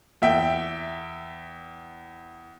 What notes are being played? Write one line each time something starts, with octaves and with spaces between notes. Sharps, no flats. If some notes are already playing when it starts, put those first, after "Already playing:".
E2 E5 G5